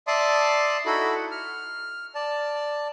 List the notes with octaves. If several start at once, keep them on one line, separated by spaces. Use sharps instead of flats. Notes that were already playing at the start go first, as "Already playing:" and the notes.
D5 E5 A5 C6 D6 D#6
D#4 E4 F#4 A4 B5
F#5
F6
D5 A5